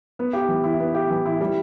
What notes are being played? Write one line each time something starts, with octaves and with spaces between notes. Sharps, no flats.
B3
G4
E3
E4
B3
G4
E3
E4
G3